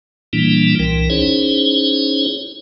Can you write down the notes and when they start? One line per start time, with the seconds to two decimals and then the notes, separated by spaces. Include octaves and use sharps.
0.33 A#2 E3 G3 A#3 D4 E4
0.79 C2 E3 A#4
1.10 C#4 D#4 E4 G#4 C5 C#5